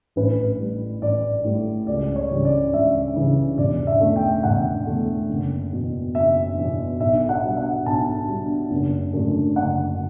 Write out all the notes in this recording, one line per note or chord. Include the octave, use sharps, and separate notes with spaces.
A1 B4
A2 G3
A1 D5
A2 G3
C#2 D5
C#5
C#3 E3 G3 C#4
D5
C#2 E5
C#3 E3 G3 C#4
E1 D5
E5
E2 D3 A3
G5
E1 F#5
E2 D3 A3
F#1
E2 B2
F#1 E5
E2 B2
B1 E5
F#5
B2 G3 D4
F#5
B1 A5
B2 G3 D4
F#1
F#2 D3 A3 D4
F#1 F#5